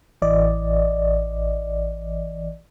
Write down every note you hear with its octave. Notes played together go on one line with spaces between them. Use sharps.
A1 E3 D5 D#5